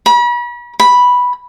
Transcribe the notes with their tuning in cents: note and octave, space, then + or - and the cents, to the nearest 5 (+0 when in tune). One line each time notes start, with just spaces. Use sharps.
B5 -40
B5 -5